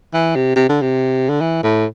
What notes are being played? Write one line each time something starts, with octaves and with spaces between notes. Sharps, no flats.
E3
C3
C3
D3
C3
D3
E3
A2